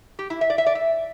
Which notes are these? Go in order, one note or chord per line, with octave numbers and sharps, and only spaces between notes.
G4
E4
E5
D5
E5
D5
E5